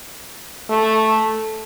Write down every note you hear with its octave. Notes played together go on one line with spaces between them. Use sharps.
A3